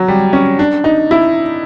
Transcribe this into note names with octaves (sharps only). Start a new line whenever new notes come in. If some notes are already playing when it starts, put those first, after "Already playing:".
Already playing: F#3
G3
C#4
D4
D#4
E4